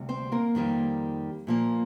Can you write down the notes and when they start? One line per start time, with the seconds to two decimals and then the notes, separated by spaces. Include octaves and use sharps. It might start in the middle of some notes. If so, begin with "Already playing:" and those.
Already playing: D2 C3 G3
0.09 C4 C5
0.32 A#3 A#4
0.55 F2 D#3 G3 A#3
1.47 A#2 F3 A#3